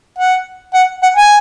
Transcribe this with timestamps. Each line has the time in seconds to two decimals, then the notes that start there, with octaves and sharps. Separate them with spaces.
0.18 F#5
0.74 F#5
1.03 F#5
1.17 G#5